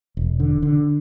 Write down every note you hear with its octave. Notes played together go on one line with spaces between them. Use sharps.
E1
D3
D3